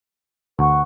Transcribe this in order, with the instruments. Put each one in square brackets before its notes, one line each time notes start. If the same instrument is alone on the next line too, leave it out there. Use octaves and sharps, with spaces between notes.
[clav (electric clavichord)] D2 [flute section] B4 F#5 C#6